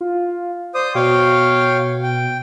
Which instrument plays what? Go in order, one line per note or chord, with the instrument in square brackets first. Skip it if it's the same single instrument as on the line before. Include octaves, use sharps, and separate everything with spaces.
[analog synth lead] F4
[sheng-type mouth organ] C5 D#6 [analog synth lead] D5
[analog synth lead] B2 [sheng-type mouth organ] C#5 F5 G5
[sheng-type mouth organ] G5